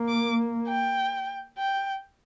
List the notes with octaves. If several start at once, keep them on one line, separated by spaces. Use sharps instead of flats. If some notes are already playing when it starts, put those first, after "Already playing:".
Already playing: A#3
D6
G5
G5